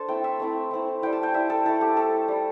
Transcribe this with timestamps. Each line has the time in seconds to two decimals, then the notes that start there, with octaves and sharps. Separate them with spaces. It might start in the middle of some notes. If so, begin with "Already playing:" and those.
Already playing: D4 A4 C5 A5
0.08 A3 C4 E4 G5
0.24 E5
0.40 A3 C4 E4
0.71 A3 C4 E4
1.02 G3 E4 G5
1.13 A5
1.23 G5
1.34 G3 E4 E5
1.50 A4
1.65 A3 E4 A4
1.81 G4
1.97 A3 E4 A4
2.28 G3 E4